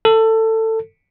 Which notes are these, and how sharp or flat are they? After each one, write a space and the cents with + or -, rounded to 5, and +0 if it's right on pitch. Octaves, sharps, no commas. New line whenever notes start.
A4 +20